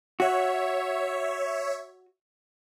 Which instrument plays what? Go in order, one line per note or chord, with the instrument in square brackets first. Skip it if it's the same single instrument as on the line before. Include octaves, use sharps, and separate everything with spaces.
[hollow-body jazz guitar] F#4 [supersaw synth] C#5 E5